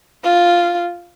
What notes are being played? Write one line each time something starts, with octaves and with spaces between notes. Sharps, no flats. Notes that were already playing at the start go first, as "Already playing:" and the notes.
F4